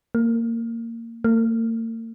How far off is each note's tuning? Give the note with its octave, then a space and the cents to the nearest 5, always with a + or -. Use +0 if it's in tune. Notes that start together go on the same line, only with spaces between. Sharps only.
A#3 -20
A#3 -45